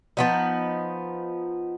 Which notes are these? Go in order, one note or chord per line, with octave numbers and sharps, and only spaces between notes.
F3 B3 D#4